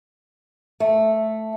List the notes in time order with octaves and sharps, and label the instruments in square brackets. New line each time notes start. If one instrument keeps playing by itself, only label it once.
[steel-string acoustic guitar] A3